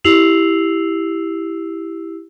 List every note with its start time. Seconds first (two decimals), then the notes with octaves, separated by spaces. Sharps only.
0.04 E4 G4 E6 C7 F7 F#7